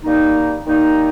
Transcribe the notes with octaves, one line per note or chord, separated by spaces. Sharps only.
D#3 G3 A#3 D#4
D#3 G3 A#3 D#4